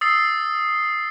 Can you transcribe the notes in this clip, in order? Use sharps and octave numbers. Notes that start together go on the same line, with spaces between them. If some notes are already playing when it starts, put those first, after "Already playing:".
D#6 E6 A6 C7